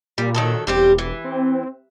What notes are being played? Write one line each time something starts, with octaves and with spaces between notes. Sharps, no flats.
A#2 G3
D#3 F#3 A4
E1 G3 C4 G4
E3
C4